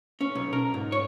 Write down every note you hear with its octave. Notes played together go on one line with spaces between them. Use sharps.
C#4
B1
A#4
G#2
C#5